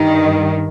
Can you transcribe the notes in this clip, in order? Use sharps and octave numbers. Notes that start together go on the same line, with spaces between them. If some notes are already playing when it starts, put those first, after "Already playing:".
Already playing: G2 D#3